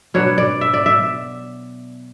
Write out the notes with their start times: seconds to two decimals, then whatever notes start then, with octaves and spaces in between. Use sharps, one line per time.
0.14 B2 F#3 B3 D4 C#5
0.38 D5
0.61 E5
0.74 D5
0.86 E5